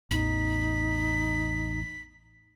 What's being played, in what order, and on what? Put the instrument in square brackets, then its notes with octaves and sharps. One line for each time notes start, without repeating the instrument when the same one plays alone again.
[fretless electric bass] A1 E2 [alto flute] D#4 [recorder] B6